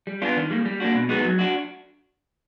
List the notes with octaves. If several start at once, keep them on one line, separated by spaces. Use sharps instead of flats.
G3
B3 D4 F4
D#3
G3 A#3
G3
A#3 D4 F#4
B2
G#3 B3 D#4 F#4
F#3
D4 F#4